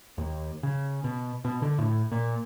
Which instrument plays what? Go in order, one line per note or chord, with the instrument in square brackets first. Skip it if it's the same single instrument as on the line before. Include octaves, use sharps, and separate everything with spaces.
[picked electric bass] D#2
C#3
B2
B2
D3
A2
A#2